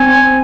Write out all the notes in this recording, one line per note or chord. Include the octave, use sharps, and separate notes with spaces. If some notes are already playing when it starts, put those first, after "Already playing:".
Already playing: C4 G#5